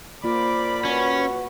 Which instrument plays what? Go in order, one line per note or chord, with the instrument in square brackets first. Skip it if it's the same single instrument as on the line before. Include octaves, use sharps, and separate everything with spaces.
[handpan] A#3 F4 [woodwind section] A#4 D5 B5 [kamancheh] C5 D6
[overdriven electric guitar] C#4 [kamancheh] F#4 B4